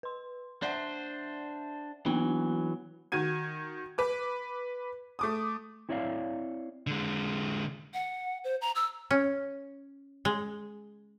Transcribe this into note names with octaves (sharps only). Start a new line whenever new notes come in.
B4 C6
D4 C5 D5 E5 F#5
E3 F#3 A#3 B3 D4
D#3 F#4 G#6 D#7
B4 D6
A3 D6 D#6
C4 E4 C#5 D5 E5 F5
D3 G#3
F#5
C5
A#5
E6
C#4
G#3